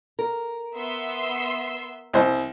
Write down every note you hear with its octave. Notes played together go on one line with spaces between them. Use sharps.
A#4
B3 E5 C6
C2 C5